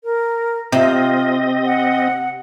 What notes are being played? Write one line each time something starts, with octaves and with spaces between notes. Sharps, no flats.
A#4
C3 C4 F4 D#5
F#5